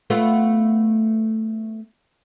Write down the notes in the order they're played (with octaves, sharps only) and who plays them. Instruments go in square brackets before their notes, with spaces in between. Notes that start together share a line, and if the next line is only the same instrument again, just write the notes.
[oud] A3 B3 F4